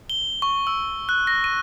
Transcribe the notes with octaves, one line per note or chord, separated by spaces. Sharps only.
G7
C#6
E6
F#6
A#6
D#7